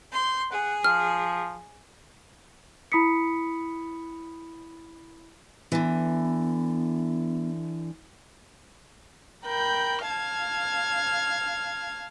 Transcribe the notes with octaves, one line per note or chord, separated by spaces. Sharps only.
C6 G6
G#4 F#5
F3 F6
E4 B5 D#6 B6 C#7
D3 E3 B3
A#4 G5 B5 G6
F5 A5 F6 G#6